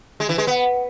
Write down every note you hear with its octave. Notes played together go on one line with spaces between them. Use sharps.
G#3
E3
G#3
B3